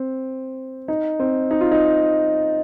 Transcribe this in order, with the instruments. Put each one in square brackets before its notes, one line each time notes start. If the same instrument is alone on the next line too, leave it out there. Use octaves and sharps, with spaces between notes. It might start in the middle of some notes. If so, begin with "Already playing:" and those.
Already playing: [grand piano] C4
D#4
C4
D#4
F4
D#4